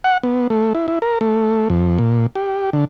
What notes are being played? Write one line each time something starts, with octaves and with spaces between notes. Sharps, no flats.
F#5
B3
A3
E4
E4
A#4
A3
F2
A#2
G4
D3